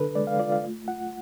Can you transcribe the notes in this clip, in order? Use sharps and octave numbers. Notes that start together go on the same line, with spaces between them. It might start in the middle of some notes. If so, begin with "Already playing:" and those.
Already playing: D3 D4 A4 B4
G#3 D5
F5
F4 D5
F5
A3
F4 F#5